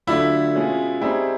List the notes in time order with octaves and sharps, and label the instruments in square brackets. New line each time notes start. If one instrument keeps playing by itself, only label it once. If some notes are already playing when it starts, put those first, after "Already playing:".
[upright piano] D3 F#3 A3 D4 F4 [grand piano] E4
[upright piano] B2 G#3 C#4 F4
[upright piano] G3 C4 D#4 G#4 [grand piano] E4